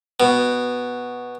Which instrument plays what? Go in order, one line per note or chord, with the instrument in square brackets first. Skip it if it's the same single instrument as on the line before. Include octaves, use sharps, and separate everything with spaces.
[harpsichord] B2